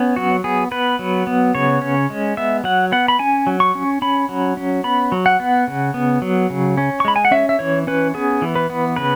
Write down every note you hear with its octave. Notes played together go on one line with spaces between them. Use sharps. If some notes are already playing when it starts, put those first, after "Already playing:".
Already playing: B3 C#4
F#3 F#4
B3 G#4
B3 B4
F#3
B3
C#3 C#5
C#4
G#3
B3 E5
F#3 F#5
B3 F#5
B5
C#4 G#5
F#3
C#6
C#4
C#4 B5
F#3
C#4
B3 B5
F#3
F#5
B3
C#3
B3
F#3
C#3
C#4
C#6
G#3 B5
G#5
F#5
C#4 E5
E5
E3 C#5
C#4 B4
B3 G#4
E3
B4
B3
C#3 B4